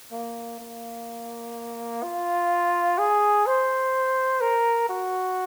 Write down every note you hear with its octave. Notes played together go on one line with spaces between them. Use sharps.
A#3
A#3
F4
G#4
C5
A#4
F#4